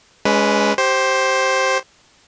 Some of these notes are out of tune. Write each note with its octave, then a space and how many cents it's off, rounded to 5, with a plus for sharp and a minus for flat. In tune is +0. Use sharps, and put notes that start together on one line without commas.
G#3 +0 C#4 +30 B4 +0
G4 -20 C5 +10